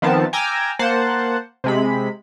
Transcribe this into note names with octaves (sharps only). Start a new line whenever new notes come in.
D#3 F3 B3 C4 A5
G5 G#5 A#5 D6 E6 F6
A#3 C5 F#5 A5
C3 G#3 B5